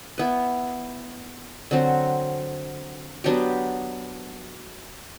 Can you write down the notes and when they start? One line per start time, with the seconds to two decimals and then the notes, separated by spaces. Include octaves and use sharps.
0.18 B3 E4 B4
1.71 D3 F#3 C4 F#4
3.24 F#3 B3 D4 G4